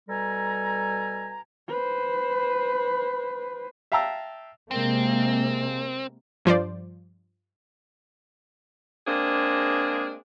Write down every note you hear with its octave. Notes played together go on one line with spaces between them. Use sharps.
B2 G3 A4 G#5 A#5
B4 C5
E5 F5 G5 A5 A#5 E6
C3 G#3 A#3 C4
G2 F3 C5 D5
G#3 A#3 C4 D4 G#4